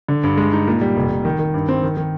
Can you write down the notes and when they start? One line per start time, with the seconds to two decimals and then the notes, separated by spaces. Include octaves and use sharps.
0.08 D3
0.23 G2
0.37 G#3
0.53 D#4
0.67 A#2
0.81 G3
0.97 F1
1.10 F1
1.25 D#3
1.39 D#3
1.54 G2
1.69 C4
1.83 D#3
1.97 D#3